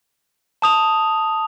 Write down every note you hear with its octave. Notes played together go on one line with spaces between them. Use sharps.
A5 D#6 F7